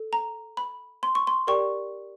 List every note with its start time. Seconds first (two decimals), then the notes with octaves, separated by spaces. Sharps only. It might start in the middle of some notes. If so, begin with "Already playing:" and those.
Already playing: A4
0.13 A#5
0.57 B5
1.03 C6
1.15 C#6
1.27 C6
1.47 G4 A#4 D5 G5 C#6